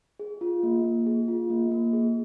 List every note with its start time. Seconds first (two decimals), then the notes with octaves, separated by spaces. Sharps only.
0.20 G#4
0.41 F4
0.63 A#3
0.84 A#3
1.06 G#4
1.28 F4
1.50 A#3
1.71 A#3
1.93 G#4